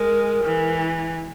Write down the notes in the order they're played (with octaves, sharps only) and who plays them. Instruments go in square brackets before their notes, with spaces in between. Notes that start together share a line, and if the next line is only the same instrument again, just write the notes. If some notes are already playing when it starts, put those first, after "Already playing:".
Already playing: [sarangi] G#3 [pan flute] A#4
[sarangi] E3